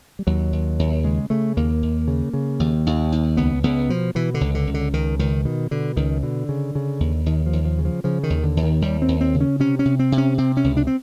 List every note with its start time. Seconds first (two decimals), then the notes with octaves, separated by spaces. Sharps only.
0.19 G3
0.27 D#2 F#3
0.53 D#2
0.79 D#2
1.04 C#3 G#3
1.30 C#3 A3
1.57 D#2 A#3
1.83 D#2
2.08 C#3
2.33 C#3
2.60 D#2
2.87 D#2
3.12 D#2
3.37 C#2 B3
3.63 C#2 B3
3.89 B2 F3
4.15 B2 E3
4.34 D3
4.41 C#2
4.55 D3
4.67 C#2
4.74 D3
4.93 C#2 D#3
5.19 C#2 D#3
5.45 B2 D#3
5.71 B2 D3
5.96 C#2 D#3
6.23 B2 D3
6.49 C#3
6.75 C#3
7.00 D#2
7.26 D#2 D#3
7.46 F3
7.53 D#2
7.65 F3
7.78 C#3
7.85 F3
8.04 C#3 F3
8.23 D#3
8.30 D#2
8.43 D3
8.57 D#2
8.63 D#3
8.82 D#2 G3
9.02 C4
9.08 D#2
9.21 C4
9.34 C#3
9.41 C#4
9.60 C3 C#4
9.79 C#4
9.85 C3
9.99 C4
10.12 C3
10.18 C#4
10.38 C3 C4
10.57 C#4
10.64 C#2
10.77 D4
10.87 C4